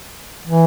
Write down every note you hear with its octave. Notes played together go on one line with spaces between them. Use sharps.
E3